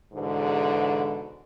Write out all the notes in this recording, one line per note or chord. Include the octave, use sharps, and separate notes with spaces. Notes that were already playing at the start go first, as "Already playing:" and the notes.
E2 G#2 B2 D3